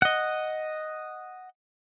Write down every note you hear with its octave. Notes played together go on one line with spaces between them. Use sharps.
D#5 F#5